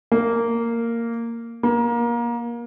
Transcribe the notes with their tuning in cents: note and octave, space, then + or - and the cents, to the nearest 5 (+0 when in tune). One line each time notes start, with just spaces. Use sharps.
A#3 -10
A#3 +25